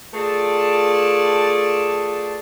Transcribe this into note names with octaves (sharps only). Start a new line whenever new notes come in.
A3 F4 G#4 B4 D5 A5